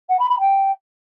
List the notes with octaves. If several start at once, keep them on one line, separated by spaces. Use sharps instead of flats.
F#5
B5
B5
G5